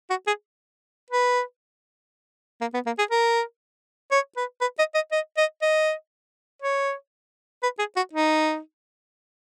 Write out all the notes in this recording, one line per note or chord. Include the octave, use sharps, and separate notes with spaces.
F#4
G#4
B4
A#3
B3
A#3
G#4
A#4
C#5
B4
B4
D#5
D#5
D#5
D#5
D#5
C#5
B4
G#4
F#4
D#4